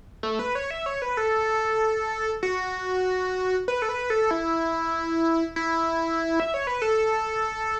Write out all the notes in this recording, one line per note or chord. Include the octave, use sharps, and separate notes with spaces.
A3
B4
C#5
E5
C#5
B4
A4
F#4
B4
A4
B4
A4
E4
E4
E5
C#5
B4
A4